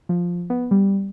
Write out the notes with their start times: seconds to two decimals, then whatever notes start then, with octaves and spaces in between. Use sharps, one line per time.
0.09 F3
0.50 B3
0.71 G3